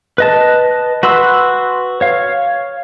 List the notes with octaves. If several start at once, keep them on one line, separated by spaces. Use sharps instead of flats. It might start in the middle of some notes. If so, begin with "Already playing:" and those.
B4 D#5 A5
F#4 B4 C6 E6
C#5 F5